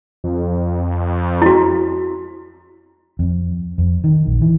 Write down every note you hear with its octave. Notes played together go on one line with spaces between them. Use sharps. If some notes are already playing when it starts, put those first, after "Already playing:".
F2
E4 F#4
F2
F2
D#3
A#1
E3